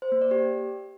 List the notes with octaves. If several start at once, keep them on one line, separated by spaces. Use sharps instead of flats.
C5
A#3
D5
G4